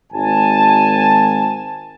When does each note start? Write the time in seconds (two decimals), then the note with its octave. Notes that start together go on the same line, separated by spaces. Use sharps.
0.12 G#1 G#5 A5